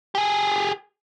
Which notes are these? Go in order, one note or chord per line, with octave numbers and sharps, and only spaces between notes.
G4 G#4